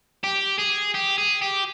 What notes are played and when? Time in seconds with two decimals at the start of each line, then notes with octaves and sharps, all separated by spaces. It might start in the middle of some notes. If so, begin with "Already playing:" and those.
0.24 G4
0.59 G#4
0.95 G4
1.18 G#4
1.42 G4